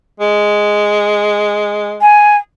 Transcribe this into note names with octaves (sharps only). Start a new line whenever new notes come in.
G#3
G#5